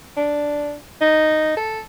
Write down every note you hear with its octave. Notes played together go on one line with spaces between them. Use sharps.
D4
D#4
A4